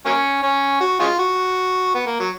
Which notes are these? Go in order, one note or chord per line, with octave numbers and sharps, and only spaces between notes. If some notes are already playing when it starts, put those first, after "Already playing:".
F#3 A#3 C#4
C#4
F#4
G#3 C#4 F4
F#4
B3
A#3
F#3